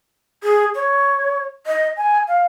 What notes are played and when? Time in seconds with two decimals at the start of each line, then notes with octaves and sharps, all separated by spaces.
0.44 G#4
0.75 C#5
1.67 D#5
1.97 G#5
2.28 F5